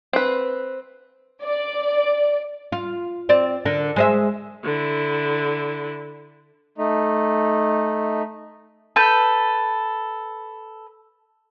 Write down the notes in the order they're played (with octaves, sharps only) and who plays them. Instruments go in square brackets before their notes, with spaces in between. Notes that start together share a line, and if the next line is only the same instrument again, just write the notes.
[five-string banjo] C4 B4
[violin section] D5
[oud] F4
C4 D5
D3 A#4
G#3 C5 E5
[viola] D3 E4
[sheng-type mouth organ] A3 D#4
[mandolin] A4 B4 G6